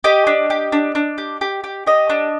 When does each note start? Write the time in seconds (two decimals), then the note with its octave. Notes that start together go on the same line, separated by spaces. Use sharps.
0.04 G4 D#5
0.27 D4
0.50 G4
0.72 D4
0.95 D4
1.18 G4
1.41 G4
1.64 G4
1.87 G4 D#5
2.10 D4